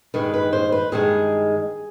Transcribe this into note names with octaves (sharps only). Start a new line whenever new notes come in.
G2 D#3 G#3 B4
B4
C5
B4
G2 D#3 G#3 G#4